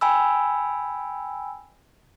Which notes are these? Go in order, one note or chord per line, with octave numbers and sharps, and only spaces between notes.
G5 G#5 B5 E6